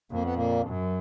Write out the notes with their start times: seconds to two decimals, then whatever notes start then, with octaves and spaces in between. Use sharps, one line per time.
0.12 F2 A#3
0.23 B3
0.34 A#2 A#3
0.68 F#2